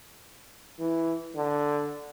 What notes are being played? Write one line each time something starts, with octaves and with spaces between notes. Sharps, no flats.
E3
D3